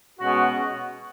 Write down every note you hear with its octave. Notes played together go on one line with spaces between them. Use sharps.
B2 G#3 C#4 F#4